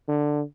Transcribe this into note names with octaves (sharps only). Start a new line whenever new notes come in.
D3